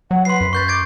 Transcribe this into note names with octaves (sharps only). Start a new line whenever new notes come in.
F#3 F#5
B4 C6 C7
F#2
B4 C#6 G6 A6
D6 G#6 A6 D7